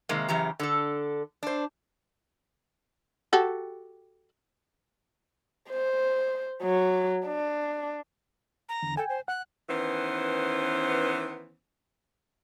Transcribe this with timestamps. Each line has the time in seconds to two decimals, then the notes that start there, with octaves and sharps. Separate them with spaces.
0.09 C3 D#3 G#3 A#3
0.28 F#2 C#3 E3 G4 A#5
0.60 D3 A4
1.43 D4 C5
3.33 F#4 G4 A4
5.70 C5
6.63 F#3
7.26 D4
8.69 A#5
8.83 E2 D3
8.97 A4 G5 G#5
9.09 C5
9.28 F#5 F#6
9.70 D#3 E3 B3 C#4 C5